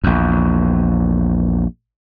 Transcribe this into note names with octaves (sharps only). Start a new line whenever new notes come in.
A#1 E2